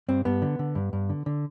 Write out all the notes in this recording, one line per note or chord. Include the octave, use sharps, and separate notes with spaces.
G2 C4
G2 B3
D3
D3
G2
G2
D3
D3